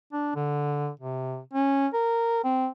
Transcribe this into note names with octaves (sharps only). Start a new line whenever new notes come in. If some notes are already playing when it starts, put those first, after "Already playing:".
D4
D3
C3
C#4
A#4
C4